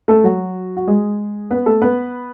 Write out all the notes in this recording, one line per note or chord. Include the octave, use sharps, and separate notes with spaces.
A3 A4
F#3 F#4
F#4
G#3 G#4
B3 B4
A3 A4
B3 B4